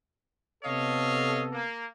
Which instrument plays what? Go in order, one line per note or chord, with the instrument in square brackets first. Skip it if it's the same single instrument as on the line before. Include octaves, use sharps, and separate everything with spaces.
[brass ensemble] C3 B3 A4 [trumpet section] C#5 D#5 F5
[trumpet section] A#3